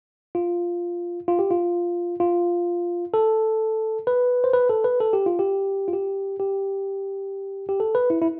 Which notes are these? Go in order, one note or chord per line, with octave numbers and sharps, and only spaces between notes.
F4
F4
G4
F4
F4
A4
B4
C5
B4
A4
B4
A4
G4
F4
G4
F4
G4
G4
G4
A4
B4
E4
E4